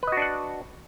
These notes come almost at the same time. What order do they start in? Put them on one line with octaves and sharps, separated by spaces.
B4 D#5 F#4 D4 F#5